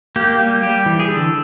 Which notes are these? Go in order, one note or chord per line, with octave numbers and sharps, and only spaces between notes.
A#3 G4
G3
G3 G4
E3
G#4
D3 A4